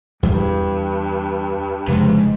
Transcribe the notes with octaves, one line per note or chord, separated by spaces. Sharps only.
E2 G2 G3
F1 F2 G#2 C#3